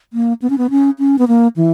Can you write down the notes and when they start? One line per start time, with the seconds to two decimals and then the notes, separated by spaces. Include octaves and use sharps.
0.13 A#3
0.42 B3
0.50 C#4
0.58 B3
0.70 C#4
0.99 C#4
1.19 B3
1.28 A#3
1.56 E3